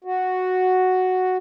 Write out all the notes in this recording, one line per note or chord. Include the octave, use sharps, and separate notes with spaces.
F#4